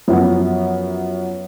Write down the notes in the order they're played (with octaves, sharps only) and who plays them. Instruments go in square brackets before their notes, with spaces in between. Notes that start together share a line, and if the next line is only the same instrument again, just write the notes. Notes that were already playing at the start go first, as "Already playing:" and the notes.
[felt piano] F#2 F3 F#3 B3